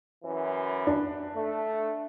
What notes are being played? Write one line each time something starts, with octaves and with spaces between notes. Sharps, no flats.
F#2 E3
D4
A3